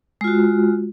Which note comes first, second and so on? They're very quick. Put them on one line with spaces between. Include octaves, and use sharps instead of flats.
G#3 F4 F#4